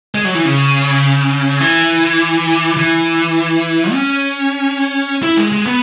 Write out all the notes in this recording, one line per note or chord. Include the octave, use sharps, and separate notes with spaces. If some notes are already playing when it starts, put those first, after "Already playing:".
G#3
F#3
E3
C#3
E3
E3
C#4
E4
G#3
G#3
B3